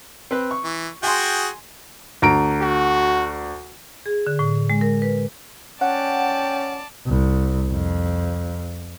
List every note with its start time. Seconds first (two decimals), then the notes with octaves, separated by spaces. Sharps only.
0.31 C4 B4
0.51 C#6
0.64 E3
1.03 F#4 G#4 G5 G#5 C6
2.22 D2 A#5 D7
2.61 F#4
4.06 G#4
4.27 D3
4.39 A2
4.70 G#3
4.81 A#4
5.02 B4
5.81 C#4 D5 F#5 G5 A5
7.06 C2
7.70 F2